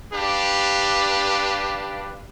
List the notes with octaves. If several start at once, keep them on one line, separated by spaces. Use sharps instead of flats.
D4 G4 B4 F5